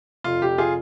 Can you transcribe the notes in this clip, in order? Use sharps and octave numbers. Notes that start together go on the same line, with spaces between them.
F1 F4
F1 G4
F4 G#4